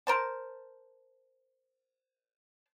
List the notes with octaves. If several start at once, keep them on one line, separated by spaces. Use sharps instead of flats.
A#4 C5 A5